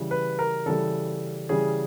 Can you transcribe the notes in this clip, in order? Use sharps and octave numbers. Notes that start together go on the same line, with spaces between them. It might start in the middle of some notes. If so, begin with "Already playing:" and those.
Already playing: C#3 E3 G3
B4
A#4
C#3 E3 G3 A4
C#3 E3 G3 G#4